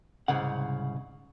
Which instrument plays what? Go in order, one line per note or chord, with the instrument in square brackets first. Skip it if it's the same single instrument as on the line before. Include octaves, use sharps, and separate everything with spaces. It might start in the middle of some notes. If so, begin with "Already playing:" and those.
[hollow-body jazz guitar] C2 G#2 C#3 F#5